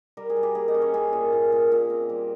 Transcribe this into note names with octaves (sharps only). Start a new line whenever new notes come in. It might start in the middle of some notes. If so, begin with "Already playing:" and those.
G3 A#4
G#4
G3
G4
A#3 G#4
D#5
C#4
C#5
C#4 G#4
A#2
A#2
A#2
A#2
C4
G3